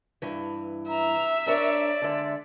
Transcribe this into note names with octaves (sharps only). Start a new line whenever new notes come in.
G2 E3
E5 A#5
D4 A#4 C#5 D5
D3 G#3 E5